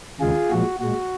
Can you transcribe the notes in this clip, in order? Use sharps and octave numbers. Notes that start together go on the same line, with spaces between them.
D#2 C#3 G#3 F4 G#4
A#2 F3 G#3 F#4
A#2 G#3 F#4